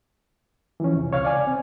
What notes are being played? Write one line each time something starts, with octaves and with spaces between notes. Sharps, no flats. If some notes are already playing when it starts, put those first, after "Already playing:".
E3 F3 C#4
C2 F2 C3
C#2 C#5 F5 F6
D5 G#5
C4